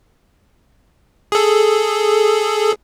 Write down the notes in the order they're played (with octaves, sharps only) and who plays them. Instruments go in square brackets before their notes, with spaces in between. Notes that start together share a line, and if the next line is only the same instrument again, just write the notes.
[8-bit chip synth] G#4 A4